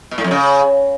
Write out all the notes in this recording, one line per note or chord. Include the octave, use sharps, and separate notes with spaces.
B2
A2
F2
C#3